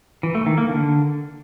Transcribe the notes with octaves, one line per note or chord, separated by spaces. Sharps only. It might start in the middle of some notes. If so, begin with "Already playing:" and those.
E3
A3
D#3
A#3
D3